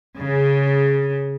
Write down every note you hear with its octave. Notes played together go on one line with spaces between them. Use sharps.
C#3